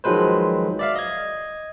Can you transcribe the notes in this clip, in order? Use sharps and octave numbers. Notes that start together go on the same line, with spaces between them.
D#3 F3 F#3 G#3 B4 C5
D5 E5 F5
D#5 G#6